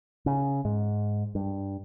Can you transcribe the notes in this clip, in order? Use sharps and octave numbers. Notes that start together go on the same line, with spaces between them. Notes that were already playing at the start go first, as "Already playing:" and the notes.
C#3
G#2
G2